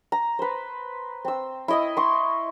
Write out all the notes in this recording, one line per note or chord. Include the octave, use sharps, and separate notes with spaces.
A#5
B4 C5
C4 E6
E4 D#5 D#6
C6 C#6